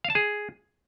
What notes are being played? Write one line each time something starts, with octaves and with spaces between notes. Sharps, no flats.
F5
A5
G#4